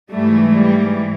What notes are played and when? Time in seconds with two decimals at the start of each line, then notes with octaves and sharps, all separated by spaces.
0.11 G#2 E3 G3 A3
0.53 G3